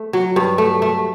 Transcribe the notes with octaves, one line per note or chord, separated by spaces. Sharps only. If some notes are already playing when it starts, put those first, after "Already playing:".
Already playing: A3
F#3
G2
A3
A3